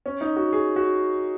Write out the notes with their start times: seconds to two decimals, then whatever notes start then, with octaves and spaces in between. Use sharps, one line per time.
0.06 C#4
0.21 D#4
0.36 F#4
0.53 G#4
0.76 F#4